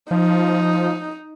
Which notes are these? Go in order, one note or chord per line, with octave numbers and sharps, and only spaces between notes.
F3 D#4